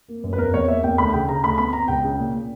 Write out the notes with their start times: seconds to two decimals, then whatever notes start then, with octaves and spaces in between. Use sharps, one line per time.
0.08 A#3
0.23 F#2
0.33 B4
0.38 E2 A#4
0.54 E2 C#5
0.68 A#3 E5
0.83 E2 G5
0.98 D2 B5
1.13 C#3 G5
1.29 C#3 A#5
1.43 D2 B5
1.58 B3 B5
1.73 B3 A#5
1.88 C#2 G5
2.04 C#3
2.18 A#2
2.34 A#2